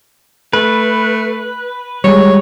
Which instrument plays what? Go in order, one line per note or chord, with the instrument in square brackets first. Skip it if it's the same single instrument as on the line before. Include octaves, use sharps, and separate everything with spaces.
[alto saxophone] A3 [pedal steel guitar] B4
[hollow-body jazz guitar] G3 G#3 [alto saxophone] C#5